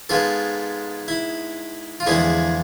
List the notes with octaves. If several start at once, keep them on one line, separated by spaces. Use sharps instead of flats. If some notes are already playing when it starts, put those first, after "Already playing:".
G#2 G#3 B3 F4 A4
E4
F4
E2 D3 F3 G#3 E4 G#4